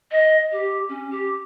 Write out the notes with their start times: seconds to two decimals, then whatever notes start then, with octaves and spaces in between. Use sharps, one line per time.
0.12 D#5
0.52 G4
0.89 C#4
1.11 G4